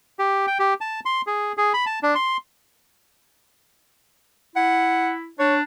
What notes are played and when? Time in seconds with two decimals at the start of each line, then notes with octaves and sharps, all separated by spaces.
0.19 G4
0.47 G5
0.59 G4
0.81 A5
1.05 C6
1.27 G#4
1.58 G#4
1.74 B5
1.86 A5
2.03 D4
2.15 C6
4.56 E4 F#5
5.39 D4 C#5